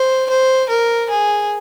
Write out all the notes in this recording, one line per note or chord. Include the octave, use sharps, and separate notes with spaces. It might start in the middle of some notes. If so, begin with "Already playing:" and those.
Already playing: C5
C5
A#4
G#4